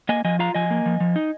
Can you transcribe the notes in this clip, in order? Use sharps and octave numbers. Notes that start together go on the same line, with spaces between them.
A#3 D#5 G#5
F3 D#5 G#5
F4 F5 A#5
F3 D#5 G#5
A#3
F3
F3
D#4